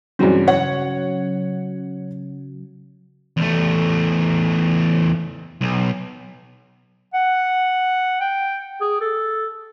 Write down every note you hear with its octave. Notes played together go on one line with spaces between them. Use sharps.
G2 C#3 E3 F#3 C4 C#4
C#5 F#5
E2 A3
B1
F#5
G5
G#4
A4